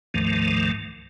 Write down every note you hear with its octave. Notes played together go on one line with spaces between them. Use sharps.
D2 G#2 D#3 F3 A3